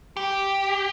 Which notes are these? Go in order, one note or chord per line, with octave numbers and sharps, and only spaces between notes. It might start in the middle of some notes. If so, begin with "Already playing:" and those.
G4